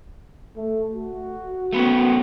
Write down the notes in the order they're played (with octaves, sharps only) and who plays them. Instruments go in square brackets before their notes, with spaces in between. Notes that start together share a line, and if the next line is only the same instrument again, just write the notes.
[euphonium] A3
F#4
[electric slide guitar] A3 B3 C#4